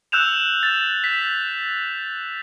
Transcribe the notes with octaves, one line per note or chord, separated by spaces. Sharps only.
E6 F#6 G6 E7 F7
A6
B6